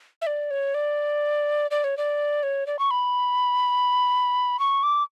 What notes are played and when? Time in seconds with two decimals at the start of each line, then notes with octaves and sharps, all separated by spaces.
0.22 E5
0.27 D5
0.51 C#5
0.74 D5
1.71 D5
1.84 C#5
1.97 D5
2.43 C#5
2.67 D5
2.79 C#6
2.91 B5
4.59 C#6
4.83 D6